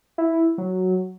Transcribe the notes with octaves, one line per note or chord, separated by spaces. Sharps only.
E4
F#3